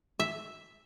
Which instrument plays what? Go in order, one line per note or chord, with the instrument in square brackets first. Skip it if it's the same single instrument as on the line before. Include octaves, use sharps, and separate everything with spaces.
[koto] E5